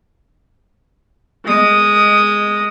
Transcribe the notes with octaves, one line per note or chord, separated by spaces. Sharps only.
G#3 D#6